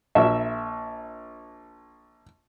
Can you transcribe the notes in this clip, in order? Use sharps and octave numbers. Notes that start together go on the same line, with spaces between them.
A#1 E5